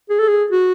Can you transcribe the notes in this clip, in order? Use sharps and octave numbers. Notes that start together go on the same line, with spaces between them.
G#4
A4
G#4
F#4